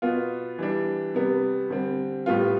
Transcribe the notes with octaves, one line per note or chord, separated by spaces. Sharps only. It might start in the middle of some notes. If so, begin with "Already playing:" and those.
B2 B3 F4
E3 G3 D4
C3 G3 B3
D3 G3 C4
A2 G3 B3 F4